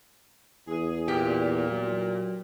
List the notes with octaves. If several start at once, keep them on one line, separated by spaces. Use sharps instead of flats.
E2 G#4
A#2 G4
F#3